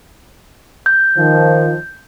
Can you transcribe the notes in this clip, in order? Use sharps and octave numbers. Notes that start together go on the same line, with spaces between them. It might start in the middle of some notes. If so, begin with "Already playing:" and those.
G6
D#3 F3